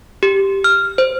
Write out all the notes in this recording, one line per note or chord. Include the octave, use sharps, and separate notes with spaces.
G4
F6
C5